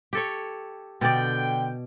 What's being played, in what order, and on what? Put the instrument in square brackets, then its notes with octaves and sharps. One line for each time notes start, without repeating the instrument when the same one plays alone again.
[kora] G4 A4 C#5
[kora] B2 D5 [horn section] D3 G5